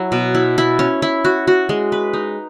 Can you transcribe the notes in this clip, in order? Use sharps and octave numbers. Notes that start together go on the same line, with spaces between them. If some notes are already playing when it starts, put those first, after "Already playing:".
Already playing: F#3 E4
B2
E4
E4
C#4
E4
F#4
F#4
G#3
B4
D#4